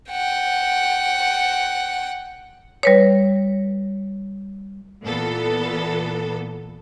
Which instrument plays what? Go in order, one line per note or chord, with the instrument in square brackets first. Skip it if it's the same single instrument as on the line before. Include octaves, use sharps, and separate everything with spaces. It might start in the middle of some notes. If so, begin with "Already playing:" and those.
[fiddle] F#5 G5
[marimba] G3 B4 C#5
[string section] A#2 E3 B3 A4